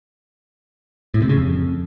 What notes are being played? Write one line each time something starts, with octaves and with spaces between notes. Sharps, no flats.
A2
C3
C#3
F2